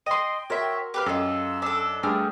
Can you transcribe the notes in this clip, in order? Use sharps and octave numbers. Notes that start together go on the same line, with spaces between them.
D#5 G5 C6 D#7
F#4 A#4 C#5 E5 C6
G4 B4 F5 G5
F#2 F4 A4 D#5 E6
D4 A4
G2 A3 D4 G4 G#4 F6